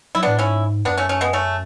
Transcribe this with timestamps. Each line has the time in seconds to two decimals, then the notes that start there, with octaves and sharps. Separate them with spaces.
0.15 F#3 E4
0.23 A2 B3 D4
0.39 G#2 C#4 E4
0.85 F#2 B3 D4
0.97 A3 C#4
1.09 A3 C#4
1.21 G#3 B3
1.33 A3 C#4